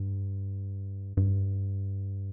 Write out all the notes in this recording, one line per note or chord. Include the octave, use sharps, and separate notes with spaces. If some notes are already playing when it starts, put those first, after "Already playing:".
Already playing: G2
G2